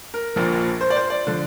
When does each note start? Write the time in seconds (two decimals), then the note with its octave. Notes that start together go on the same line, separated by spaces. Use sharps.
0.14 A#4
0.36 A#1 A#2 F3
0.81 C5
0.90 D5
0.96 C5
1.10 D5
1.27 D3 F3